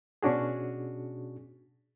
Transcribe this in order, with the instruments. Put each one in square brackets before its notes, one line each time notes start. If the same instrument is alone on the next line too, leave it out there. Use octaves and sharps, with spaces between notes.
[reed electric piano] B2 C#4 D4 F#4 G#4